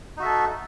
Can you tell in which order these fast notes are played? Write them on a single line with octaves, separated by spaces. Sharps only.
D#4 F#4 E5 A4